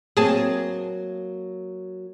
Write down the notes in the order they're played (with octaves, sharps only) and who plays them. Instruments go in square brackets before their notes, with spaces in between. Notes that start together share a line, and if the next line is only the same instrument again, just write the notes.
[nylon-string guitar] F#3 A#3 C4 [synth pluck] G#4 A5